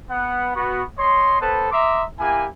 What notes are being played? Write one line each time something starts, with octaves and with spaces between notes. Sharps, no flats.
B3 F#5
B3 F#4
C#5 D#5 C6
B3 A4 B4 C5 A5
D#5 E5 A#5 C6 D6
A#3 E4 G4 G#5